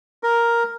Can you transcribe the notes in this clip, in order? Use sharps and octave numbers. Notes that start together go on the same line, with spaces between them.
A#4